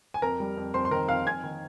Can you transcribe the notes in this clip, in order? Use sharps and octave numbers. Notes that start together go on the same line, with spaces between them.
G#5
F2 A#4 A#5
G3
F2
F2 C5 C6
C6
D#3 A#4 A#5
F2 F5 F6
F2 G#5 G#6
D#3